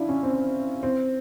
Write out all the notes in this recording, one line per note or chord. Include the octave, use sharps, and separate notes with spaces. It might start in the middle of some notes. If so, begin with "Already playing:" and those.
Already playing: D4 E4 F4
C#4
C4
C4